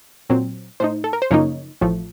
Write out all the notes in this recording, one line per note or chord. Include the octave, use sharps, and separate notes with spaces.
A#2 F#3 C4
A2 A3 D#4 C5
A4
A#4
C5
F#2 C#3 F3 A#3 D#4 C#5
A1 A2 F3 A3